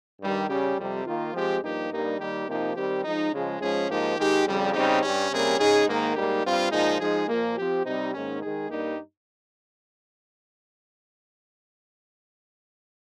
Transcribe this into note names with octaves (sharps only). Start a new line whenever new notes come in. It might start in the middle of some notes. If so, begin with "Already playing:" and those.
G2 D#3 G3
C#3 G3 C#4 G4
F2 C3 G3
D#3 A#3 F4
F3 G#3 C4 G4
G2 F3 A#3 D#4 G4
G2 G3 A#3 D#4
D#3 G3 A#3 D#4 G4
C3 F3 A#3 D#4 G4
D#3 G3 C4 G4
F3 G#3 D#4
C#3 F3 G#3
G#2 F3 G#3 C#4 G#4
G#2 F3 A#3 D#4 G4
D#3 G#3 D#4 G4
F2 C#3 G3
C#3 G3 C4 D#4 G4
G2 G3 C#4
C3 G3 A#3 C#4 G#4
C#3 G#3 D#4 G#4
G#2 D#3 A#3
G#2 G3 A#3 D#4 G4
G2 G3 C4 F4
A#2 F3 G#3 D#4
F3 G#3 D#4 G#4
A#2 F3 A#3
F3 C4 G4
C3 G3 C4 D#4
G#2 D#3 A#3 C#4
D#3 G#3 D#4 G#4
G2 G3 A#3 D#4 G4